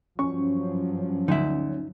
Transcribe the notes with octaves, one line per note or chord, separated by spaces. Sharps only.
G2 F3 F#3 C#4 C#6
D2 D#4 E5